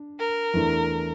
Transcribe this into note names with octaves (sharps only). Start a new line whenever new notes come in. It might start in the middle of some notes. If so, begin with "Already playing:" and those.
Already playing: D4
A#4
E2 E3 A3 D4